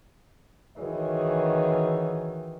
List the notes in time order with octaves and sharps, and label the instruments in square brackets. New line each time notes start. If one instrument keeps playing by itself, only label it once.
[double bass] D#3 E3 [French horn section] F#4 G#4 C#5